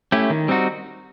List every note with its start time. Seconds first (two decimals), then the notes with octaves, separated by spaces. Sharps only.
0.12 A3 C#4 E4 G4
0.30 D#3
0.48 G3 C4 D#4 F#4